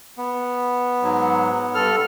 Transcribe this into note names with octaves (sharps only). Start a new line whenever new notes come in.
B3
G#2 F#3
G2 A4 F6